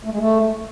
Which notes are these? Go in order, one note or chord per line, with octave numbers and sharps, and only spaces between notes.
A3
G#3
A3